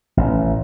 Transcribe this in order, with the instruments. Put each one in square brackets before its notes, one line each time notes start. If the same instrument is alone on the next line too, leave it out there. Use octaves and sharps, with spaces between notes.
[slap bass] A1